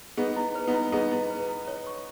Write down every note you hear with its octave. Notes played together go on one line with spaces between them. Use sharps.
B3 D#4 G#4
E4
B4
B3 D#4
E4
B3 D#4 G#4
E4
B4
E4
C#5
C#6